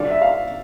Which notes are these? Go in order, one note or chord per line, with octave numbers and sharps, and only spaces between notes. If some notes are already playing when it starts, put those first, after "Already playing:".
Already playing: D3 G3 D4 F4 D5
E5
F5